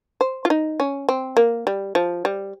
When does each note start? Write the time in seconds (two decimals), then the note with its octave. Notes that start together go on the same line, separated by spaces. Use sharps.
0.21 C5
0.45 F4
0.50 D#4
0.80 C#4
1.09 C4
1.37 A#3
1.67 G3
1.95 F3
2.25 G3